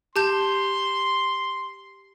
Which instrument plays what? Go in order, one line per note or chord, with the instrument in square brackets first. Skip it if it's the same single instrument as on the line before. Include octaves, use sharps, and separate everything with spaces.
[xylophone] G4 A5 G6 [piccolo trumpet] C6